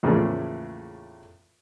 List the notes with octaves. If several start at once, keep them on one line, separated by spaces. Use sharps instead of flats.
E2 A2 C#3 F3 A3 A#3